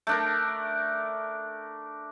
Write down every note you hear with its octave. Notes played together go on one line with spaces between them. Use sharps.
A3 D4 A#4